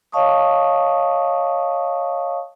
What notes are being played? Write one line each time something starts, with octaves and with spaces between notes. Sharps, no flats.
C#5 D#5 F5 A5 C#6 D#6